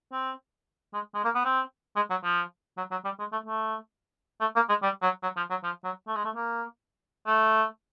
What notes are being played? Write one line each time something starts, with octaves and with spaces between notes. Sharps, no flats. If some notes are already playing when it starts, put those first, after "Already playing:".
C4
G#3
G#3
A#3
B3
C4
G#3
F#3
F3
F#3
F#3
G3
G#3
A3
A3
A3
A#3
G#3
G3
F#3
F#3
F3
F#3
F3
F#3
A3
G#3
A3
A#3
A3